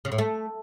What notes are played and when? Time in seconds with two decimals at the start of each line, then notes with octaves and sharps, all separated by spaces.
0.05 C#3
0.12 A2
0.18 A3